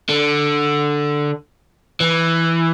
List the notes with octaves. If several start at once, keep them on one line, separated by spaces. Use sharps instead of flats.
D3
E3